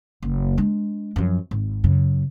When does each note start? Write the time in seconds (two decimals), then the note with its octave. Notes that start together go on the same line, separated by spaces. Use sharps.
0.23 F#1
0.58 G#3 D4
1.16 F#2 F3
1.51 G#1
1.84 F#2 C#3